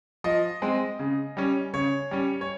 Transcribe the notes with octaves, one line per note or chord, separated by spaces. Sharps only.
F3 D#5
G#3 C4
C#3
G3 C#4
C#3 C#5
G3 C#4
C#5